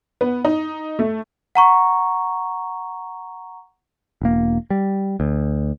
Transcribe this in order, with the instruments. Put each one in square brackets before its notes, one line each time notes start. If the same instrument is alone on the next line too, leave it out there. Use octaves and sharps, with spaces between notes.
[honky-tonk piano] B3
D#4
A3
[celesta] F#5 A#5 C#6
[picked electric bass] E1 A#3
G3
D2